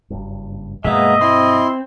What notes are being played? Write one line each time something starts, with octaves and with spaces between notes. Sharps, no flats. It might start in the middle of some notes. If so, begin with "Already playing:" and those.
F#1 G2
G2 B2 F#3 G#3 A#3 B3 D#5 E5
C4 E4 C6